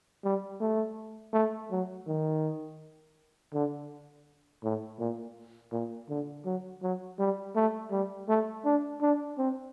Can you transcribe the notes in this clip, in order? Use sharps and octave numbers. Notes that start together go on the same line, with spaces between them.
G3
A3
A3
F#3
D#3
D3
A2
A#2
A#2
D3
F#3
F#3
G3
A3
G3
A3
D4
D4
C4